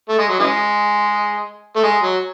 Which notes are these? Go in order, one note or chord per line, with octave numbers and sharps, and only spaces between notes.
A3
G#3
F#3
C#3 E3 G#3
A3
G#3
F#3